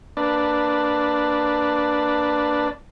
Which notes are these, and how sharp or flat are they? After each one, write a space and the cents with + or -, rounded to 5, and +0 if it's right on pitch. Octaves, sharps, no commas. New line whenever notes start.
A#3 -10 D4 +0 B4 +0